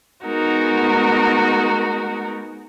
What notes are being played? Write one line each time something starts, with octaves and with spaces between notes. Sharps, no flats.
G#3 B3 D#4 F#4 A#4